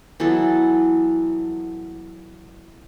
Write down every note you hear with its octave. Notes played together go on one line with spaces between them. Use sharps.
E3 F#3 B3 A4